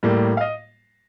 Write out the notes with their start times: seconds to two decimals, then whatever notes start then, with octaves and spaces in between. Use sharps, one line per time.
0.03 A2 G3 A#3
0.37 F5
0.41 D#5